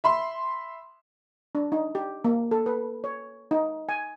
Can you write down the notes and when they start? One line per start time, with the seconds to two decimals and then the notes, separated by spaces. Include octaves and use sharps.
0.04 E5 B5 C6
1.55 D4
1.72 D#4
1.95 G4
2.24 A#3
2.51 A4
2.66 B4
3.04 C#5
3.51 D#4
3.89 G#5